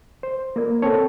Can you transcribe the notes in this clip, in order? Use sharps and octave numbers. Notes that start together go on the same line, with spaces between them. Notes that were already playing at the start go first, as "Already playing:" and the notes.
C5
A#3 F4 A#4 D5
C4 A4 C#5 G5 A5